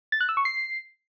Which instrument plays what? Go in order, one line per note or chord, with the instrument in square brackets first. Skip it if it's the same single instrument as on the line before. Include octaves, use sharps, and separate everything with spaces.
[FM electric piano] A6
F#6
E6
C#6
C7